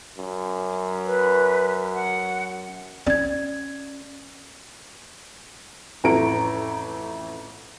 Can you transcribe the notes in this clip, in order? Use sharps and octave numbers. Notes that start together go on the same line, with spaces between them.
F#2
B4
F#5
C#4 D5 G#6
A1 F2 E4 A4 A#5 D7